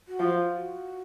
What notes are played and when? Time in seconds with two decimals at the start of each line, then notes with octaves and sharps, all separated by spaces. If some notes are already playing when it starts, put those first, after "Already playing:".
0.08 F#4
0.20 F3
0.31 F4
0.55 F#4